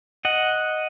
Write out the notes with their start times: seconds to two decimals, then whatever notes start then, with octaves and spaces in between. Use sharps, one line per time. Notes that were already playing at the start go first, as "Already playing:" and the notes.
0.25 D#5 F#5